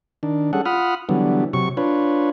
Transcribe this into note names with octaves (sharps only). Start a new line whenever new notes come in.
D#3 D4
G3 C#4 G#4 A4 F#5
F4 F#5 B5 D#6 F6
D3 E3 F#3 G3 B3
C3 F#3 C#6
D4 F4 B4 C#5